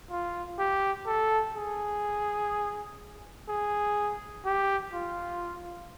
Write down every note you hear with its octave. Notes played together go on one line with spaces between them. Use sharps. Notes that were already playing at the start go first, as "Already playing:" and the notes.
F4
G4
A4
G#4
G#4
G4
F4